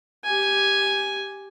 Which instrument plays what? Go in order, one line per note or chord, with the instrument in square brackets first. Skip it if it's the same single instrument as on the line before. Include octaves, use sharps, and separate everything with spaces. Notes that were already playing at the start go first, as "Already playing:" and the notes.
[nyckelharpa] G4 G#5